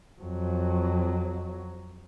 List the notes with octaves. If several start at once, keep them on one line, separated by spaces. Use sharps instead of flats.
F2 F#3